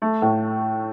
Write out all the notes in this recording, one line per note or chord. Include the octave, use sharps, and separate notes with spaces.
A3
A2